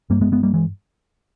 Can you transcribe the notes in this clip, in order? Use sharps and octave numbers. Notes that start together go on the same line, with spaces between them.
G2 G3 A#3
G#3 B3
G#3 B3
G3 A#3
E3 G#3